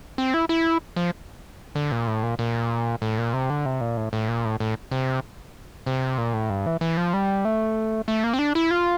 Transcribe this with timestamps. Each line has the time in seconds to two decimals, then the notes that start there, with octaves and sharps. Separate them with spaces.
0.18 C4
0.34 E4
0.49 E4
0.96 F3
1.75 D3
1.92 A#2
2.07 A2
2.23 A#2
2.39 A#2
3.02 A2
3.18 A#2
3.33 C3
3.50 D3
3.66 C3
3.81 A#2
3.97 A2
4.13 A2
4.28 A#2
4.45 A2
4.60 A2
4.91 C3
5.86 C3
6.18 A#2
6.34 A2
6.50 G2
6.66 E3
6.81 E3
6.97 F3
7.13 G3
7.45 A3
8.08 A3
8.24 A#3
8.34 C4
8.39 D4
8.55 E4
8.71 F4